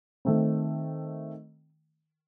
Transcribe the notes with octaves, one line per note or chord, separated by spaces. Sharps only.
D#3 A3 C4